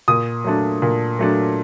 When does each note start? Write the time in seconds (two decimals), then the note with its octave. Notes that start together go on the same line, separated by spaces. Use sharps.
0.08 A#2 D#6
0.44 F#3 A3 D4
0.82 A#2
1.19 F#3 A3 D4